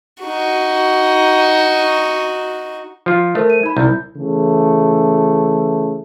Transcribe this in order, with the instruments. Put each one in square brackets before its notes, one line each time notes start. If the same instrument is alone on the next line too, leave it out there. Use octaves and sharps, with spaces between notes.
[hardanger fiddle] D#4 F#4
[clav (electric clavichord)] F3 F4
[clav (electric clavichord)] A3 [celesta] A#4 C5 E5
[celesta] D#7
D#4 B5
[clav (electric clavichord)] C2 [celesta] E4 G6
[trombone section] C#3 E3 A3